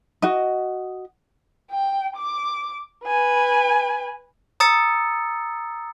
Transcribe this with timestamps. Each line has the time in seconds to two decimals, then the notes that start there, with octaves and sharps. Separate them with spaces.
0.22 F#4 D#5
1.71 G5
2.17 D6
3.06 B4 G#5
4.60 A#5 D#6 E6 A6 C#7